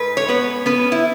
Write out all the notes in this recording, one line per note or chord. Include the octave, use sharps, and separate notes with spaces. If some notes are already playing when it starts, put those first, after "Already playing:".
Already playing: G#2 B4
C#5
G#2 B3 B4
B3 C#4 B4
E4